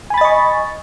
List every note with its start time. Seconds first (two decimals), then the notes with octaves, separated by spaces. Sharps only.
0.10 G#5
0.14 B5
0.18 A6
0.21 D#5
0.25 C#6